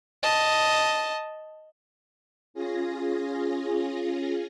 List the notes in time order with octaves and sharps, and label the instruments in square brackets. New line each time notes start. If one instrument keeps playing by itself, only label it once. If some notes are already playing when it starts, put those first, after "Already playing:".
[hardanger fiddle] D#5 A5
[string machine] C#4 F4 G#4 A#6